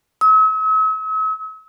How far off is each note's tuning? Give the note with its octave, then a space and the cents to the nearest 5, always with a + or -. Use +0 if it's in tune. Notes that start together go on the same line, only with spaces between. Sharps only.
E6 -45